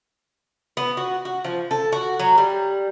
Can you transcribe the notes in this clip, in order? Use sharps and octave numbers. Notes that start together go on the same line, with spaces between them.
B3
F#4
F#4
F3
A4
F#4
F#3
G3